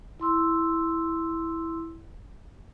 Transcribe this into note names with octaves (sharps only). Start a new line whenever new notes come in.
E4 C6 E6